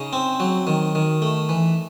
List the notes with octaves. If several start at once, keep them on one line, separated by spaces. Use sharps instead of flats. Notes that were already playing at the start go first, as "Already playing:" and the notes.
Already playing: C#3 D#4
C4
F#3
D#3
D#3
A3
E3